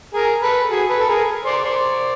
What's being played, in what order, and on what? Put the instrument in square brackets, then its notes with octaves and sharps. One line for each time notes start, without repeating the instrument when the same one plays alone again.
[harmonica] G#4 A#4
A4 B4
F#4 G#4
A4 B4
A4
G#4 A#4
C5 D5
C5 D5